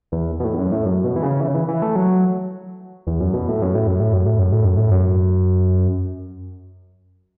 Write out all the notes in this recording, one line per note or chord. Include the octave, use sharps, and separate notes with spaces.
E2
B2
A2
E2
F#2
A2
F#2
B2
E3
C#3
E3
C#3
E3
E3
A3
F#3
E2
F#2
B2
A2
F#2
A2
F#2
A2
F#2
A2
F#2
A2
F#2
A2
F#2